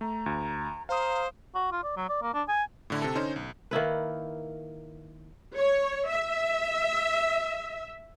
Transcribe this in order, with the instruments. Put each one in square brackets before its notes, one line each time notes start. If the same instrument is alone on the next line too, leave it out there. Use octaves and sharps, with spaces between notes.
[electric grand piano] A3 [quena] A#5
[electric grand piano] D2
[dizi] C5 [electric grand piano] F5 D#6 [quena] A#5
[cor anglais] F#4
F4
D5
F#3
D5
A#3
D4
G#5
[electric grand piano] A2 D3 E4
C3 A4
D3 C#4 D#4 C5
B1
[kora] D#3 A#3 E4 B4
[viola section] C#5
E5